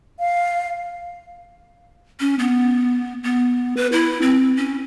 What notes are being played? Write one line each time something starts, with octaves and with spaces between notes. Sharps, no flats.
F5
C#4
B3
B3
B4
E4
C4
C#4